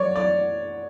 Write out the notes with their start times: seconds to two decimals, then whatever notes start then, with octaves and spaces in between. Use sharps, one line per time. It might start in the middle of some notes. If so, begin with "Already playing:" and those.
Already playing: F#3 C#5 D5
0.16 D5